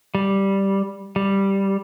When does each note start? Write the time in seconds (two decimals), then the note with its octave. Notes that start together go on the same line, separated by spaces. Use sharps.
0.15 G3
1.16 G3